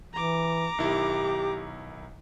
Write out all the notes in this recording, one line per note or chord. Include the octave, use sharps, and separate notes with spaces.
E3 A#5 D6
B1 D#3 E4 G4